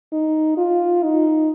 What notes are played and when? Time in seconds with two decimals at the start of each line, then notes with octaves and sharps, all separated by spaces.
0.12 D#4
0.57 F4
1.03 D#4